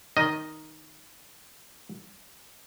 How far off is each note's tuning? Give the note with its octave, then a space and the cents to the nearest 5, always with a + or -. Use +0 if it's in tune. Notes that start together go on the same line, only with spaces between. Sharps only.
D#3 +0 D#5 +0